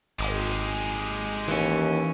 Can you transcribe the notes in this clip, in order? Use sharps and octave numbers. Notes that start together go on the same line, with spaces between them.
G#1 G#3 G4
D#2 E3 C#4